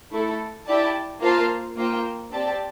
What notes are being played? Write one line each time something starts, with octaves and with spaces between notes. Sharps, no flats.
A3 E4 A4
E4 G4 D5 A5
A#3 F4 C5 F5 A5
A#3 F4 C5 G5
C4 G4 D5 A5